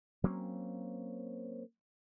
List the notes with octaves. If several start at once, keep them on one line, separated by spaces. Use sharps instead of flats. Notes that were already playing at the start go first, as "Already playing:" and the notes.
F#3 A#3 C4 C#4